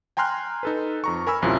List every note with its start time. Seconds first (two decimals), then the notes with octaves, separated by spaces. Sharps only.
0.17 G5 G#5 A#5 C6 F6 F#6
0.63 D#4 A4 B4
1.04 F2 A#5 C#6
1.27 A#4 G#5 B5 E6
1.42 A1 F#2 C3 E4 F4